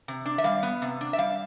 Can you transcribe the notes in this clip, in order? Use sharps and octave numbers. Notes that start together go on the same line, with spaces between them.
C3
D4
E5
G3 F5
B3
C3
D4
E5
G3 F5